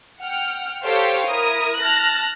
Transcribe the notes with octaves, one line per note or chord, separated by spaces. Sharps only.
F#5 G5 F6
G4 A4 C5 C#5 F5 G5
E4 A#4 D#6
A5 F6 F#6 A#6